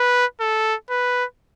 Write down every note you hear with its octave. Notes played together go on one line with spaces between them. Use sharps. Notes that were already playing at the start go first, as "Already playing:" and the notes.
Already playing: B4
A4
B4